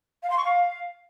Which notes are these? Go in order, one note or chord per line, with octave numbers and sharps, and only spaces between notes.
F5
C6
C#6
F5